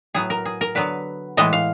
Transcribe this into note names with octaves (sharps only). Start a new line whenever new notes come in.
A2 F#3 B3 G#4
A#4
G#4
A#4
D3 F#3 B3 B4
A2 E3 G#3 B3 D#5
F5